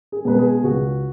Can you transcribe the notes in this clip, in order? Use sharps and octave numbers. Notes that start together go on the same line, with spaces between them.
G#4
B2 G#3 B4
G#4
C#2 F#4